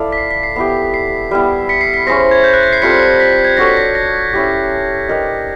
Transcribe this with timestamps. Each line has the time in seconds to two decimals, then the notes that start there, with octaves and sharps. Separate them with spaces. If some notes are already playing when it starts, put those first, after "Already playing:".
Already playing: E4 A4 D5 F5
0.12 B6
0.18 C7
0.31 B6
0.43 C7
0.56 B3 E4 G4
0.94 C7
1.31 G3 B3 E4
1.69 B6 C#7
1.81 C7
1.94 B6
2.06 C#4 E4 G#4 C5 A#6
2.31 G#6
2.44 G6
2.53 F#6
2.63 A#6
2.73 C7
2.82 G3 C4 F4 A4 B6 C#7
3.20 B6
3.45 G#6
3.57 D4 F#4 A4 C#5 A#6
3.67 B6
3.77 A#6
3.95 A#6
4.33 C#4 E4 G4
5.09 D4 G4 A#4 D#5